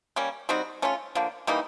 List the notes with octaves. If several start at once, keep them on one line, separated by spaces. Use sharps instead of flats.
G3 A#3 C#4
G3 C4 D#4 F#4
A3 C#4 F4
D3 F3 A#3
E3 G3 A#3 D#4